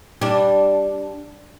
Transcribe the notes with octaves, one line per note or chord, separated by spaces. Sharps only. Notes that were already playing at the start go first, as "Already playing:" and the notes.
G3 D4